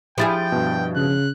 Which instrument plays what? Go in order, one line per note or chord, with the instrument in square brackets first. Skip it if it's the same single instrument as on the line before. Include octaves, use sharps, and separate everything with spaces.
[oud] F3 E4 G#4 [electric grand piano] G4 B5 A6 [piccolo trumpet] G5
[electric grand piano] G2 B2
[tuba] C#3 [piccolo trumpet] F#6